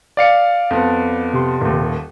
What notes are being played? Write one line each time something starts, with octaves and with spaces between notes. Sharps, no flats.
D5 F5 C#7
F2 B3
C3 G4 C6
D#1 D#2